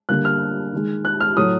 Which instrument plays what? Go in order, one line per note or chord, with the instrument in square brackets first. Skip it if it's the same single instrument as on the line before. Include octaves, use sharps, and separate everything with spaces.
[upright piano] D3 G3 A#3 F#6
F6
D#3 G#3
F#6
F6
A2 F#3 A3 D#6